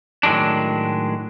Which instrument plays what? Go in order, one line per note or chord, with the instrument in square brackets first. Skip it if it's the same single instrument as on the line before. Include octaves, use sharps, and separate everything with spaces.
[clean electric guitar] A2 D#3 F#3 G#3 D4